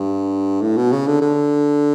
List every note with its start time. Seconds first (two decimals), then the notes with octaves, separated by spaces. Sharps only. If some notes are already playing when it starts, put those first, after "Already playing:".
Already playing: G2
0.62 A2
0.77 B2
0.92 C#3
1.07 D3
1.22 D3